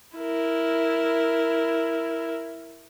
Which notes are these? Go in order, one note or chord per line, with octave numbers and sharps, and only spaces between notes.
E4 A#4